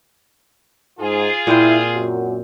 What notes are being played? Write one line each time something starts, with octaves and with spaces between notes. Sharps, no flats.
G#2 F4 G#4
A#2 C4 E4 C5
F#2 F#4